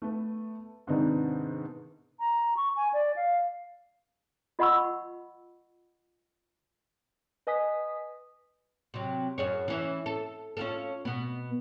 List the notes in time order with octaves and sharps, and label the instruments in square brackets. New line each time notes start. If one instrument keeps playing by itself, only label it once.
[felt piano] A3 B3 B4
G#2 C3 D#3 B3 D4 D#4
[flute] A#5
C#6
G#5
D5
F5
[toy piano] F4 D#5 F#5 B5 C#6 E6
[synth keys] B4 D#5 G#5 D#6 B6
[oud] C3 F#3
F#2 G#4 C#5
E3 C#4
A4
C#4 F4 A4
B2 B3